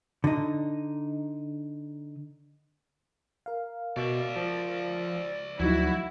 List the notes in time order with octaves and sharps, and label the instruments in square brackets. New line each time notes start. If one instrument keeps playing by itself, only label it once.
[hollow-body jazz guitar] D3 D#4
[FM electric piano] A#4 F5
[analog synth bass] B2 [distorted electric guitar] D5 E5
[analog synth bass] F3
[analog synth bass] D2 [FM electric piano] F3 F#3 D#4 [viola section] E4 [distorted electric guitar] F#4